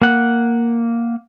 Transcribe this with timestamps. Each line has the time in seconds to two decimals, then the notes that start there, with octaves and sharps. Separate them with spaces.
0.02 A#3 F#5